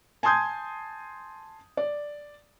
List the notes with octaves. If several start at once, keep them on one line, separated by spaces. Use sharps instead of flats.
G#5 A5 C6 D#6 G6 G#6
D5